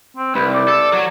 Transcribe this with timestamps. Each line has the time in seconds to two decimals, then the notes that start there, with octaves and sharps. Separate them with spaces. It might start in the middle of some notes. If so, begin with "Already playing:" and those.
0.17 C4
0.35 C2 B4
0.54 D5
0.68 A4
0.93 F#3